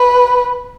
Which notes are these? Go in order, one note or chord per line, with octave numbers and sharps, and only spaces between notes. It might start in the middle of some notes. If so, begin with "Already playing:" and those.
Already playing: B4